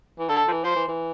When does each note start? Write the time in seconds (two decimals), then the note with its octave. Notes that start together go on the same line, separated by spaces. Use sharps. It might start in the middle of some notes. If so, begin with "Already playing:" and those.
0.19 E3
0.29 D3 A4
0.48 F3
0.52 E3
0.64 F3 C5
0.76 E3
0.88 E3